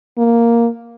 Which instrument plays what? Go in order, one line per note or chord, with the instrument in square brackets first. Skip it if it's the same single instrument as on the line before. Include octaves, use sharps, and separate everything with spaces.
[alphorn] A#3